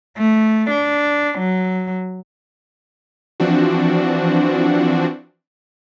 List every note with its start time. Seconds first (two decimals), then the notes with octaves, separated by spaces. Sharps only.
0.18 A3
0.70 D4
1.39 F#3
3.40 E3 F3 C4 D4 F#4